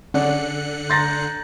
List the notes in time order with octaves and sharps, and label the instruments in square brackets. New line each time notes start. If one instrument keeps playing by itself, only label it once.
[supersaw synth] D3 F#6 C#7 [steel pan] C#4 D5 [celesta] F#5
[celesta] A#5 G6 [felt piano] C6 A6 A#6